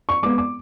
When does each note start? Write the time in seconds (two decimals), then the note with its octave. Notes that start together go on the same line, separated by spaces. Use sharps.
0.09 C#6
0.23 G#3 B3 D6
0.38 D6